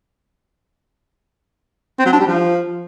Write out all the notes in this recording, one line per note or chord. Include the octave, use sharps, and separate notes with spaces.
C4
F#3
D4
G3
F3